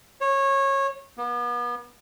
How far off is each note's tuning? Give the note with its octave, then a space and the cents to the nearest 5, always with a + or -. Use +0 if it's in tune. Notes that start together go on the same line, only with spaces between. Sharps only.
C#5 -20
B3 -35